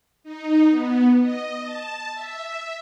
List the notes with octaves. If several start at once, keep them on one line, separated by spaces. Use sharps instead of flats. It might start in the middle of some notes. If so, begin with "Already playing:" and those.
D#4
B3
D#5
A5
E5